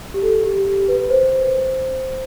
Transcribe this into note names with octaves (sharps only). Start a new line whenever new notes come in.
G4
A4
G4
G4
B4
C5